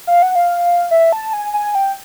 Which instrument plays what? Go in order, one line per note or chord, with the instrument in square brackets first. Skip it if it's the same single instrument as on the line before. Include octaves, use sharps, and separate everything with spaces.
[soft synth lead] F5
F#5
F5
E5
A5
G#5
G#5
G5